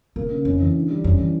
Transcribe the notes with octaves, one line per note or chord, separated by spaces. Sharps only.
C#3 A#3
C#3
F2 C#4
E3
D3
G3
F2 C#4
E3